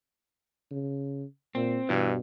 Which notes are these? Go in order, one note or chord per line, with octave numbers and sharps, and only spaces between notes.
C#3
A#2 C4
G2 B2 E3